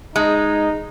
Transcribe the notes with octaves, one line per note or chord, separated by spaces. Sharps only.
G#3 D#4